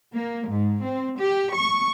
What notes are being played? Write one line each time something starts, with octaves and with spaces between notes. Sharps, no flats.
A#3
G#2
C4
G4
C#6